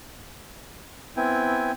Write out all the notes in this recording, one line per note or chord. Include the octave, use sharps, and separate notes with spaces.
B3 C4 E4 G5 G#5